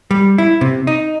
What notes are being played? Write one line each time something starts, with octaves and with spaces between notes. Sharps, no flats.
G3
E4
C3
D#4